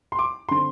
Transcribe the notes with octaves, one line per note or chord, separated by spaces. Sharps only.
C6
D6
D3 C4 C6